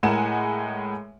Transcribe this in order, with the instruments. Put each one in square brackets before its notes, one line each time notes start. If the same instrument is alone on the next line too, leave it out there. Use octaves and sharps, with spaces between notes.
[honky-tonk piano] A2 G#3 A#4 F#5 G#5 E7